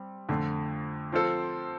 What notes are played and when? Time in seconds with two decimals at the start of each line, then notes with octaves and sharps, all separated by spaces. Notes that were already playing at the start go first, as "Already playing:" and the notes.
Already playing: G3 C4
0.29 F2 D3 A3
1.12 F3 C4 F4 A4 C5